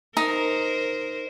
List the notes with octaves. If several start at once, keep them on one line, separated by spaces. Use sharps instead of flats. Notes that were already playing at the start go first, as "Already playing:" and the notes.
D#4 A#4 C5 A#5